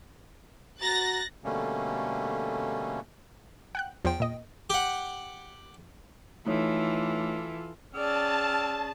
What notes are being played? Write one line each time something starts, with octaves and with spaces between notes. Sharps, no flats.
F#4 A#5 F#6 A6 A#6
B2 D3 G3 A3 A#3 C#4
F#5 G5 F#6
E2 F3 C5 G5
A#2 D#5
G4 F#5
E3 A3 D#4 F4 A4 C#5
C#4 G#4 D5 G5 A5 E6 F6